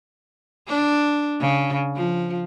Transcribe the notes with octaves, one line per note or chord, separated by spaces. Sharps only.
D4
C#3
F3